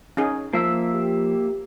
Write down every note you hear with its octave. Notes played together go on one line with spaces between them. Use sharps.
C#4 D#4 G#4
F3 A#3 E5 E6
G4